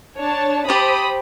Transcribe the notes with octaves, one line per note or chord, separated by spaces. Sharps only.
D4 C#5 A5
G4 C5 A5 B5 D#6